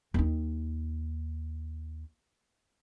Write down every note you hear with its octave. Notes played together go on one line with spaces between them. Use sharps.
D#2 D#4